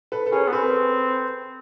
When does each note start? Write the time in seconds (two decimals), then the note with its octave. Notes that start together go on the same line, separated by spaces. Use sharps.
0.12 A4 B4
0.26 A4
0.32 C#4 G#4 A#4
0.48 B3
0.52 C4 A4 B4